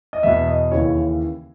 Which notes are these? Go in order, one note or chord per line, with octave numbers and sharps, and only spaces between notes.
D#5
E2 B2 E5
D#5
D#2 C#3 E3 C#5